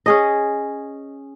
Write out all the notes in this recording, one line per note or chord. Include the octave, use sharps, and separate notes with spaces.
C#4 G#4 D#5